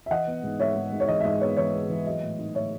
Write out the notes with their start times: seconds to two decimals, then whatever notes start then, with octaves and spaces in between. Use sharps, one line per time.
0.06 E5
0.11 E3 D#5 F#5
0.27 B3
0.43 G#2
0.60 G#2 C#5 E5
0.75 G#2
0.92 G#2
1.00 C#5
1.08 E3 D#5
1.20 E5
1.24 G#2 D#5
1.41 B3 C#5
1.57 E3 C#5
1.73 B3
1.89 E3
2.06 F#3 D#5
2.22 A2
2.39 D#4
2.54 A2 C#5 E5